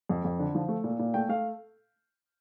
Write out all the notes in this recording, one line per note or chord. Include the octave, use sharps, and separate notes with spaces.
F2
F2
D3
F3
A3
A#2
A#2
A3 G5
A3 F5